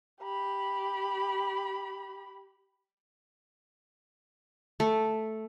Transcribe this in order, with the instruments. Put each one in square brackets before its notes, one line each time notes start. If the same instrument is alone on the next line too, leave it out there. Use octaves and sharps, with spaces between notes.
[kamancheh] G4 B5
[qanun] A3